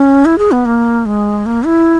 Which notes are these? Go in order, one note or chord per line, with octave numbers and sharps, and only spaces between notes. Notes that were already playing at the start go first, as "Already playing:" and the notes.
Already playing: C#4
E4
G#4
B3
A#3
G#3
A#3
E4